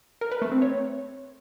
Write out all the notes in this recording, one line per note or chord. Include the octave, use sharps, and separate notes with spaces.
A#4
B4
A3
C4
C#5